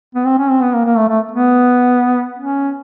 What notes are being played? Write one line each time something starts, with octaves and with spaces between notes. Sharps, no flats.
B3
C4
C#4
C4
B3
A#3
A#3
A3
A3
B3
C#4